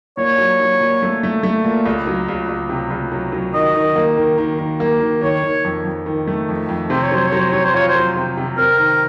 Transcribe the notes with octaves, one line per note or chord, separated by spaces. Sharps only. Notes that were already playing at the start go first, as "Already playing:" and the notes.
A#2 C#5
F#3
F#3
A#2
A3
A3
A3
A#2
C#2
F#3
C#2
C#2
C3
C#2
F#3
F#3
D#3 D#5
D#3
A#3
D#3
D#3
D#3
A#3
D#3
D#3 C#5
D#3
F2
F2
D#3
A3
F2
F2
C3 C5
C#5
F#3 C5
C#5
F#3
C5
F#3 C#5
C5
F4 C#5
C5
F#3
C3
C3
C4 A#4
D#3